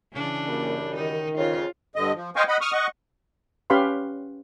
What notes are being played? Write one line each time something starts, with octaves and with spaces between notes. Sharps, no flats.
C#3 E3 D4
F#2 G3 A#3
D#3 D#4
F2 C#3 F4
G2 D3 D#5
F3
C5 D#5 F5 G5 G#5 C#6
D#5 F#5 B5
C#6 D#6 F6
D#5 F#5 C#6
C#4 G4 B4 F5 B5 C6